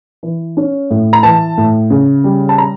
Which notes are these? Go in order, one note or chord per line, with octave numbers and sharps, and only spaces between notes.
E3
C#4
A2
A#5
E3 A5
A2
C#3
G3
A5
A#5